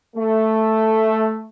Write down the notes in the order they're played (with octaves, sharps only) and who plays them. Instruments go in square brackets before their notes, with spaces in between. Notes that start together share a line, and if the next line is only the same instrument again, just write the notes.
[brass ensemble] A3